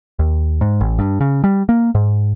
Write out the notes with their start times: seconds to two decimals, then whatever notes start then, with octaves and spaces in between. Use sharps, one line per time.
0.19 D#2
0.61 G#2
0.81 A1
0.99 G2
1.21 C#3
1.44 G3
1.69 A#3
1.95 G#2